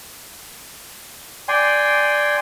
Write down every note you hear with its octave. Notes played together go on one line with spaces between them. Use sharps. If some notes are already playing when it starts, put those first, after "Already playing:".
D5 G5 G#5 C6